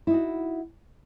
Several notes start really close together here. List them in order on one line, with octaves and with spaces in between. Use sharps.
E4 D#4 F#4